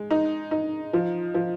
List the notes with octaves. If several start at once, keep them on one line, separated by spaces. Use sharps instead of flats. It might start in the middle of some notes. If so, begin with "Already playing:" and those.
Already playing: G#3
D#4
D#4
F3
F3